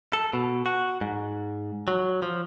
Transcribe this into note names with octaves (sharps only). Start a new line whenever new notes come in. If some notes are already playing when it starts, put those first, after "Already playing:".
A4
B2
F#4
G#2
F#3
F3